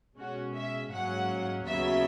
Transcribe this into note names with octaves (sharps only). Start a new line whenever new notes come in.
B2 G#3 C#4 F#4
E5
G#2 F#3 A#3 C#4 F#5
D#2 C#3 F#3 B3 E5